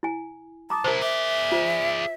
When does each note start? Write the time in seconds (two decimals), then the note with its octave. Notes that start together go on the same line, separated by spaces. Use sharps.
0.03 E4 G#5
0.70 A5 A#5 D6 D#6
0.84 C3 E4 A#4 C5
1.02 G#4 D5 E5
1.52 F4 C5